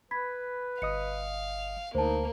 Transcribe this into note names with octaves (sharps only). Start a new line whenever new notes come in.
B4 B5 G#6 B6
G1 D#5 F5 D#6 C#7
D2 A#3 D#4 C5 A5